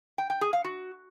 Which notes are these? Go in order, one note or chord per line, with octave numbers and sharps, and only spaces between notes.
G5
G5
G#4
F5
F#4